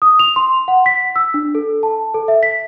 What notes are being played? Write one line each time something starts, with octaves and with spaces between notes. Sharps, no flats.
D#6
F7
C6
F#5
B6
E6
D4
A4
A5
A4
E5
B6